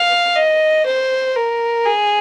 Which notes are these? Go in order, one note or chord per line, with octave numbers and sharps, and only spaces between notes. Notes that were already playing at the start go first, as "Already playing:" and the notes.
Already playing: F5
D#5
C5
A#4
G#4